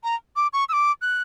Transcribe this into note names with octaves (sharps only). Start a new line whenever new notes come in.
A#5
D6
C#6
E6
D6
F#6